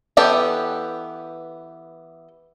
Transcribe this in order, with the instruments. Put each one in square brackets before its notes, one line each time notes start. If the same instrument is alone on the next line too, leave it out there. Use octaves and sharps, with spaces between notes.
[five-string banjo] E3 B3 G4 A4 G5